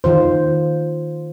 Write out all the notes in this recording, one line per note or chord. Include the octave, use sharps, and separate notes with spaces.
D#3 F4 C5